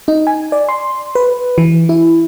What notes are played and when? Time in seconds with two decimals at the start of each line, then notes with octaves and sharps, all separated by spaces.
0.08 D#4
0.27 G#5
0.52 D5
0.69 C6
1.15 B4
1.58 E3
1.89 E4